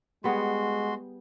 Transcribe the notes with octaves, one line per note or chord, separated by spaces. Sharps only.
G3 G#3 B3 F#4 G#4 C6